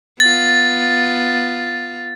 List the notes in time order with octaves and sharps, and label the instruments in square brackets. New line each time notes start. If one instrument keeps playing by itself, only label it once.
[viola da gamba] B3 F4 [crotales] A6